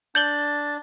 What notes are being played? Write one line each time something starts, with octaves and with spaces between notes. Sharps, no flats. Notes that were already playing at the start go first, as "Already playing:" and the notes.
D4 G6 A6 F#7 G7